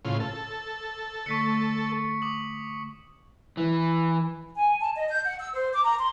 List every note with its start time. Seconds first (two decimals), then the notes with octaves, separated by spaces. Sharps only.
0.05 A2 C#3 F4
0.20 A4
1.26 D3 A3 C#6 B6 C#7
2.22 D6 D#6 F#7
3.57 E3
4.56 G#5
4.79 A5
4.95 D#5
5.09 G6
5.24 F#5
5.39 E6
5.52 C5
5.72 D6
5.83 A#5
5.97 C6